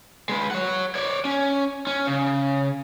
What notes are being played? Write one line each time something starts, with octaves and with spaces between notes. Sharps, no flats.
G#3 B4
C#5 F#5
C#5 D5
C#4
C#4
C#3